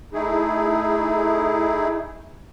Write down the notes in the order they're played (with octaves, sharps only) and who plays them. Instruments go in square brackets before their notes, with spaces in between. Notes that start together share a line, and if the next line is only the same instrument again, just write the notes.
[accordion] A3 D#4 E4 G#4